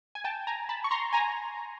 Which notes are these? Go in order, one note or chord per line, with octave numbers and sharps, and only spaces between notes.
G#5
G5 A5
G#5 A#5
A5 B5
C#6
A#5 C6
G#5 A#5